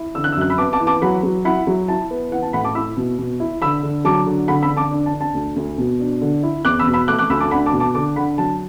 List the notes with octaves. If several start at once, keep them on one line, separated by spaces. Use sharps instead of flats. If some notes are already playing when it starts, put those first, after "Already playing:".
Already playing: E4
D3 E6
F#6
E6
F#2 F#6
B5 E6
B3 A5 D6
A5 D6
E3
A5 D6
F#3 F#5 B5
F#3
E4 F#5 B5
F#3
E4 A5
B3
E3 F#5
A5
A2 F#5 B5
A5 D6
E4 B5 E6
B2
B2
E4
D3 B5 E6
D3
F#3 A5 D6
D3
D3 F#5 B5
B5 E6
D3
A5 D6
D4
A5
D4
A5
D2
D2
B2
D4
D3
E4
E2 D6 F#6
B5 E6
B2
B5 E6
A3 D6 F#6
D6 F#6
D2 B5 E6
A5 D6
D4 F#5 B5
A5 D6
B2
A5 D6
D3 A5 D6
D3 F#5 B5
F#3 A5